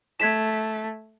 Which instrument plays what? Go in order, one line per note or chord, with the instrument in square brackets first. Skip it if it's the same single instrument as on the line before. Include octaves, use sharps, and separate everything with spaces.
[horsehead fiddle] A3 [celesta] G#6 B6 E7